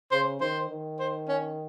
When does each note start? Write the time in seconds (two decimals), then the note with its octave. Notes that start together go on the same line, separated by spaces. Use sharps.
0.11 C#3 C5
0.41 D#3 C5
0.70 D#3
0.99 C5
1.28 C#4